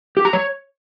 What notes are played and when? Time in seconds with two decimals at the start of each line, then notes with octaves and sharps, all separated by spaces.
0.17 G4
0.25 A#5
0.33 C#5